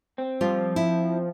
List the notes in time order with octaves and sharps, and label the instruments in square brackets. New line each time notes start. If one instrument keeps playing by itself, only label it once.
[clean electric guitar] C4
[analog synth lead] F3 [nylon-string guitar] G3 F4
[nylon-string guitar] E4